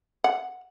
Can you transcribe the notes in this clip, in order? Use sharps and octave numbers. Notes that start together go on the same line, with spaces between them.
F#5